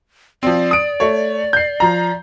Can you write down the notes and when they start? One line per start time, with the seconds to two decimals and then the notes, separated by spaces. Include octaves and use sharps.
0.43 F3 C4 D5
0.71 D#6 D7
1.00 A3 C#5
1.53 G6 C7
1.80 F3 A#5